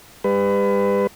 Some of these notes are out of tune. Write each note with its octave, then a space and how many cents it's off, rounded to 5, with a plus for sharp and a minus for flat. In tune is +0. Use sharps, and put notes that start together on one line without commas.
G3 +35 B4 +25